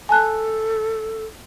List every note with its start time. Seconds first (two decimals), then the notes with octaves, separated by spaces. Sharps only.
0.09 A4 G#5 A5 F#6